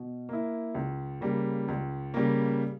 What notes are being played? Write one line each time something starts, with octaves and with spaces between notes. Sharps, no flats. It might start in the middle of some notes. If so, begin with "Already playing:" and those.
Already playing: B2
A#3 E4
C#2
C#3 G3 A#3
C#2
C#3 G3 A#3